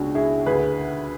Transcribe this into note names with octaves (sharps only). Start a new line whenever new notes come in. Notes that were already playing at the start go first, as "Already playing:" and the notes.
Already playing: C#2 B2 C#4 D4 F#4
E4 G#4
D2 D3 G#4 B4